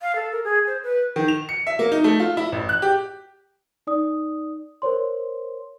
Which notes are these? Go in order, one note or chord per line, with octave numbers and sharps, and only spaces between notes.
F5
A4
A#4
G#4
C5
B4
D#3
F7
C#7
E5
A#3
D#4
A3
F4
E4
A1
F#6
G4
D#4 D5 D#6
A#4 C5 C#5 C6